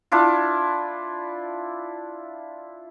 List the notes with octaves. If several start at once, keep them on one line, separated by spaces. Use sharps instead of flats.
D4 E4 F4